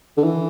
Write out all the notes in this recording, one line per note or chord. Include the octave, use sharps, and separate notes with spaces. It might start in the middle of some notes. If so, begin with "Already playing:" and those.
D3
E3